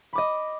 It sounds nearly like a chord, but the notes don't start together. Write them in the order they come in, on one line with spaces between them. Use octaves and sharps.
B5 D6 D#5